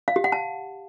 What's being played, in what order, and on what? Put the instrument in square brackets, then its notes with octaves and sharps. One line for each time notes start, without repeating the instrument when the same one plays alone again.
[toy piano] F5
G4
F#5
A5